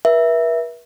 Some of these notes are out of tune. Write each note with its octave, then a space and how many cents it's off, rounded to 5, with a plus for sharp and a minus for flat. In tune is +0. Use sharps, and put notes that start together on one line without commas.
B4 -45 E5 +0